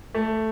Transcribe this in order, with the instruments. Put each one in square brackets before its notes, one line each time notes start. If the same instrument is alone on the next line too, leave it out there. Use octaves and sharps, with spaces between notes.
[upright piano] A3